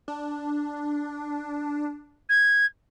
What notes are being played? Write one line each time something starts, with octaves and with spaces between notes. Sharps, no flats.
D4
G#6